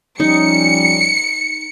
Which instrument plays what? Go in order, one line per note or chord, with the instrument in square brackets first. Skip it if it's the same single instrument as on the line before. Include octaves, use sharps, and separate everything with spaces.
[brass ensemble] F3 G3 C#4 [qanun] D#4 [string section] C#7